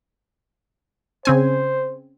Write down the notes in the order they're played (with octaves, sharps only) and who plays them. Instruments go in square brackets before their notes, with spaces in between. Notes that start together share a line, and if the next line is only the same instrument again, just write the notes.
[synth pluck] C#3 C4 G#5 [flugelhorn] C5